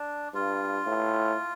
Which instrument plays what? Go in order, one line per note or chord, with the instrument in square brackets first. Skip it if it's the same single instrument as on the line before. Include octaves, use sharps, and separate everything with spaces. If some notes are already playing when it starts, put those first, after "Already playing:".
Already playing: [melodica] D4
[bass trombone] G2 [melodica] F4
[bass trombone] A2